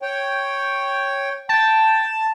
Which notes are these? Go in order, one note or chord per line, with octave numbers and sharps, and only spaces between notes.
C#5 G5
G5 A5